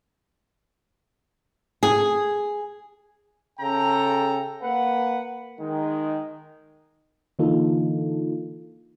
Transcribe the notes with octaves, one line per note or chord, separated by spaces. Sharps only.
G#4
C#3 A4 G5 A#5
A#3 B4 F#5
D#3 G#3
D3 E3 A#3 D#4 F4 A4